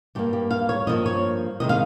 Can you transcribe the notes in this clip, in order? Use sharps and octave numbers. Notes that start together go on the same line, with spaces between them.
G2 G3 A#3 G4
G4
F5
C#5
G2 F3 A#3 D#5
C#5
C3 D#3 G#3 D#5
F5